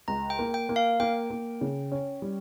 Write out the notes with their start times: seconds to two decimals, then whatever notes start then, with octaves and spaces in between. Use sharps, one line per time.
0.08 C#2 A#5
0.30 G5
0.39 A#3
0.54 G5
0.69 A#3
0.76 F5
1.00 A#3 G5
1.30 A#3
1.61 C#3
1.92 C#4
2.22 G3